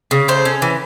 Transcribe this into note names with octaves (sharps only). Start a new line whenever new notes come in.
C#3
A3 C5
C#4
E3